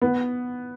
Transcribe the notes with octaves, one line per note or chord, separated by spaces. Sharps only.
B3